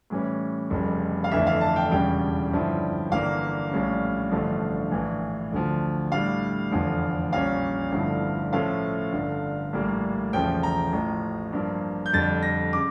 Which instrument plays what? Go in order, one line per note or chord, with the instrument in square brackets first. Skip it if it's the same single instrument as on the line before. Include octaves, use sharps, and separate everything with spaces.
[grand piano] A2 E3 G3 C#4
F1 F2 C#3 G3
F5
G1 F2 E3 A3 D4 E5
F5
A5
G5
E1 E2 C#3 G3 D4 G5
G1 G2 F3 C#4 E4
G1 G2 E3 A#3 F5
A#1 A2 G3 C#4
A1 G2 D3 F3 A3
A#1 A2 E3
D2 D3 F3
A2 G3 D4 F5
F1 E2 D3 F3
A#1 A#2 G3 C#4 F5
G1 G2 F3 A3 E4
A2 F3 A3 C#4 F5
G1 G2 D3
A#1 A2 G3 A#3
E1 E2 C#3 F3 A3 G5
A#5
A1 A2 F3
G2 F3 A#3
G6
F2 D3 G3 A6
A#6
C#3 D6